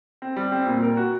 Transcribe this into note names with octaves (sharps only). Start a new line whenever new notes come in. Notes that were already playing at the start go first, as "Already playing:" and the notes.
C4
G3
C4
A#2
A#4
F#4